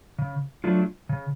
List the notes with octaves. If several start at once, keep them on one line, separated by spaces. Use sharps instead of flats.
C#3
F#3 A3 D4 F4
C#3